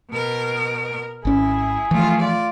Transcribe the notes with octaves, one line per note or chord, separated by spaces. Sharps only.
B2 A#4
G#1 C#4 E4 G#4
E3 F3 A3 F4
F4 D5